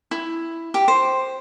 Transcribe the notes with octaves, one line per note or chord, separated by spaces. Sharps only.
E4
G4
C5